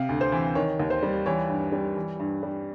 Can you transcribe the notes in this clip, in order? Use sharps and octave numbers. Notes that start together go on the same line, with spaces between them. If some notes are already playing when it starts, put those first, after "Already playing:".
Already playing: C3 F5
D2
C5
E3
D#3 C#5
D#2
C5
G3
E3 C#5
G2
G3
E3
G2
G3